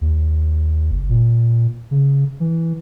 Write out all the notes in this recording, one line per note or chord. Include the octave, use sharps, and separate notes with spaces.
D#2
F#1
A#2
C#3
E3